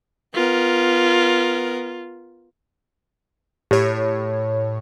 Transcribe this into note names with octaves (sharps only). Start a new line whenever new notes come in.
B3 F4 A#4
A2 G4 C#5